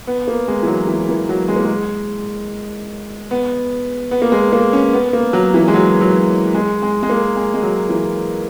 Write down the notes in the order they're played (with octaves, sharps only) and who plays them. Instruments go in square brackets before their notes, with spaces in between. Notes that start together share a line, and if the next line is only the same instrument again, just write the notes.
[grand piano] B3
A#3
G#3
E3
F#3
E3
E3
F#3
G#3
A#3
G#3
B3
B3
A#3
G#3
A#3
C#4
B3
A#3
F#3
E3
G#3
F#3
F#3
G#3
G#3
G#3
A#3
G#3
G#3
F#3
E3